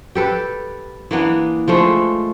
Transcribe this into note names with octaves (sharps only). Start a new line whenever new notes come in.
G4 A4 B4
E3 A#3 B3 D4
F3 G#3 A3 D4